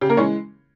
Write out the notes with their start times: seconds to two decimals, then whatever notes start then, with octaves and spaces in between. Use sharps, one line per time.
0.01 C#3 G4
0.09 A#3 A#4
0.17 E3 G#3 C#4 C#5